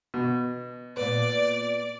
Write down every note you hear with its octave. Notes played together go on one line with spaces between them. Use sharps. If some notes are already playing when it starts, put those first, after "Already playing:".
B2
A#2 B3 D5